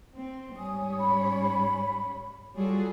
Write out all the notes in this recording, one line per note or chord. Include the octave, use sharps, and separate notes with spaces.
C4
G#2 G3 C#5 G#5 D#6
C#4 B5
G3 F4 F#4 G#4 A4 C#5